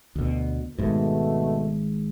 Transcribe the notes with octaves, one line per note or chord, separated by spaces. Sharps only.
D2 B2
G#1 G#2 B2 A3